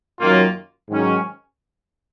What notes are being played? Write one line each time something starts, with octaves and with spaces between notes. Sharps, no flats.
F#2 D#3 F#3 A#3 F4
G#2 D#3 F#3 C#4